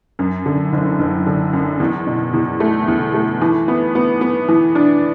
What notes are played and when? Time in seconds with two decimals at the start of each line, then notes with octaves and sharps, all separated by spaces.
0.19 F#2
0.46 D3
0.73 F#1
0.99 F#1
1.27 D3
1.53 F#2
1.80 E2
2.07 B2
2.33 E2
2.60 A3
2.88 E2
3.14 A3
3.42 E3
3.68 B3
3.95 B3
4.21 B3
4.48 E3
4.75 D4